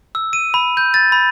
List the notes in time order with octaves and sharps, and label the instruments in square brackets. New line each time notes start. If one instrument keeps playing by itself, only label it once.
[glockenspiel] E6
D#7
B5
G6
A6
B5